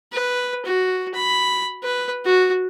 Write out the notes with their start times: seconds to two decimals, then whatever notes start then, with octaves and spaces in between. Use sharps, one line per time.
0.12 B4
0.65 F#4
1.14 B5
1.83 B4
2.25 F#4